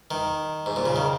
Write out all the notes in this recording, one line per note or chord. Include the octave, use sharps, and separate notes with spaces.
D#3
G#2
A#2
C#3
D#3